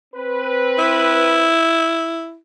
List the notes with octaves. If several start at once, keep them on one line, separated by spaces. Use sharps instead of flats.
C4 B4
E4